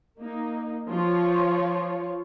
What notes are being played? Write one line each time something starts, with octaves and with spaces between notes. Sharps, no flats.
A#3 D#4
F3 F4 C#5